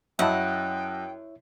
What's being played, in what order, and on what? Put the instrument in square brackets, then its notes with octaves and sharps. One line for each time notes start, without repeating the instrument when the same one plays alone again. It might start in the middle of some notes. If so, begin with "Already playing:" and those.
[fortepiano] F#2 D#5 A5 [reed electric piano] E4 C#5 E5 [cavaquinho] F#5 [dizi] G5